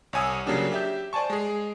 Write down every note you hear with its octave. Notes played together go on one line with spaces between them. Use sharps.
C2 C#5 G#5 D#6 E6
C#3 F#3 A#3 C#4 D4 G4
G4 E5 G6
C5 D5 G#5 A5 C#6
G#3 G#4